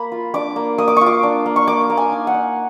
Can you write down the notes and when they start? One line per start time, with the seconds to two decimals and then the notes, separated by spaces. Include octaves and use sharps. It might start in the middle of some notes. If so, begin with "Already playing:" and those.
Already playing: A#3 B5
0.12 F4
0.34 D4 D6
0.56 A#3
0.78 A#3 D#6
0.88 D6
0.97 F4 C#6
1.06 D6
1.23 D4
1.46 A#3
1.56 C#6
1.68 A#3 D6
1.90 A#3
1.97 G#5
2.12 D#4
2.27 F#5
2.34 D#4